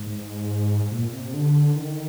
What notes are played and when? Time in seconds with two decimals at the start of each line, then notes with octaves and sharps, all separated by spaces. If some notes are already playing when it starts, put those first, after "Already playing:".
Already playing: G#2
0.91 A#2
1.12 C3
1.34 D3
1.76 D#3